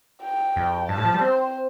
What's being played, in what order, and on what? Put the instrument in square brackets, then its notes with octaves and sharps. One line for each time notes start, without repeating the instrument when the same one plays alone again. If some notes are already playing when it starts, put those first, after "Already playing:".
[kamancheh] G5
[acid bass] F2
[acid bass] G2 [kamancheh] A5
[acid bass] A2
F3
G3
[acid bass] C4 [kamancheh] C5